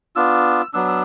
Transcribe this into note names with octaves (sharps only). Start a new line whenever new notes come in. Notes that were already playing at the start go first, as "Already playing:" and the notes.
B3 D4 F4 E6
F#3 B3 D4 E6
E6